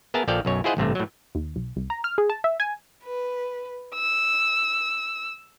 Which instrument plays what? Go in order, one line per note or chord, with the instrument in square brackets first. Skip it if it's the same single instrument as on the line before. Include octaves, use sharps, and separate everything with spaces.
[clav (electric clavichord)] B3 G#4 A#4 E5 A5
A#1 F3 A4 D5 F5 G5
B1 F#2 C#5
E4 F4 G#4 C5 D#5 F#5
A1 G2 C3 A3
A2 F#3
[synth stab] D#2
B1
C2
A#5
F6
G#4
A5
E5
G#5
[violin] B4
E6